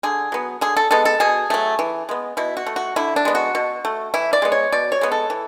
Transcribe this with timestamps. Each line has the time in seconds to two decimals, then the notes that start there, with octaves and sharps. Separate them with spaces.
0.03 D3 G#4
0.32 F#3 B3
0.61 D3 G#4
0.77 A4
0.91 G#3 B3 A4
1.05 A4
1.20 B2 G#4
1.50 F#3 A3
1.79 E3
2.09 G#3 B3
2.37 B2 E4
2.57 F#4
2.66 A3
2.76 F#4
2.96 D3 E4
3.16 D4
3.25 G#3 B3
3.35 F#4
3.55 B2
3.85 A3
4.14 E3 E4
4.33 D5
4.42 G#3 B3
4.52 C#5
4.72 B2 D5
4.92 C#5
5.01 G#3 B3
5.12 A4
5.30 E3